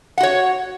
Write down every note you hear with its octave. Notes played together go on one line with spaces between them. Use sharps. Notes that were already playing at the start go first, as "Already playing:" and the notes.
F#4 C#5 F#5